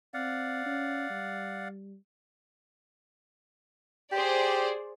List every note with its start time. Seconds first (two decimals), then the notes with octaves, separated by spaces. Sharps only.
0.14 C4 D5 F5 F#5
0.66 C#4
1.10 G3
4.12 G4 G#4 C5 D5